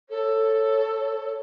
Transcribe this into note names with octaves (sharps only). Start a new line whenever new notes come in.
A4 C#5